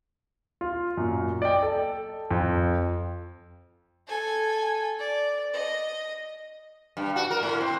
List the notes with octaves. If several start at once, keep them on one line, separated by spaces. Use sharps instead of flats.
F4
F#2 A#2
D5 D#5 G5
A4
F2
A4 G#5
D5
D#5
G2
F#4
A#4
A2
C4